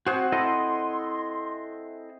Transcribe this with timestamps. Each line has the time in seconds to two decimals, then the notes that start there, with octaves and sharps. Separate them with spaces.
0.06 C4 F#4 G#4 C5 F#5
0.32 E4 A4 D#5 C6